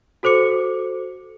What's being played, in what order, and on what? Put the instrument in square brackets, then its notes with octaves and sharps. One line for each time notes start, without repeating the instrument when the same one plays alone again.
[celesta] F#4 A4 C5 D6 C#7